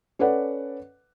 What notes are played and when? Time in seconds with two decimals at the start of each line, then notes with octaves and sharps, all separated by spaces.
0.19 C#4 A4 B4 D5 F#5